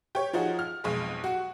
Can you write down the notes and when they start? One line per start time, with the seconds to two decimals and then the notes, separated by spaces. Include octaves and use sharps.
0.15 G4 C#5
0.33 F3 D#4 F#4 G#4
0.59 F6
0.84 B1 F2 G#3
1.24 F#4